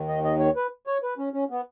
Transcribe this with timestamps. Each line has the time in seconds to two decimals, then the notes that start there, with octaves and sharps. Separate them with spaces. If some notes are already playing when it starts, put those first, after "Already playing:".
Already playing: D#2 D#3
0.08 D#5
0.24 D#5
0.40 C#5
0.56 B4
0.87 C#5
1.03 B4
1.18 C#4
1.33 C#4
1.50 B3